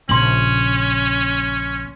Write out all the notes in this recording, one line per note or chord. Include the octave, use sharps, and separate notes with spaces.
A#1 C#3 C#4 C6 F#7